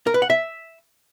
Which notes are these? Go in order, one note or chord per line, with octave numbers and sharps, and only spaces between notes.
A#4
B4
F#5
E5